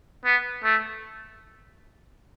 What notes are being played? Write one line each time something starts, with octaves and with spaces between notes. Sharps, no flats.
B3
A3